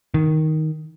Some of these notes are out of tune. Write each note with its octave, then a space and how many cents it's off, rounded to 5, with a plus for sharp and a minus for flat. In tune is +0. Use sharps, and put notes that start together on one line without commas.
D#3 +5